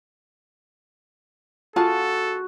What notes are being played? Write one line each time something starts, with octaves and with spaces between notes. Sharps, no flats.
F4 F#4 G#4 A4 A5